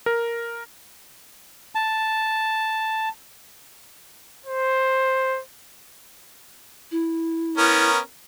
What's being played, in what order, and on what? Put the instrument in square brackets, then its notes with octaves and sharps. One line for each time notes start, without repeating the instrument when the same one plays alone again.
[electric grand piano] A#4
[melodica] A5
[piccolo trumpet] C5
[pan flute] E4
[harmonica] B3 C#4 A#4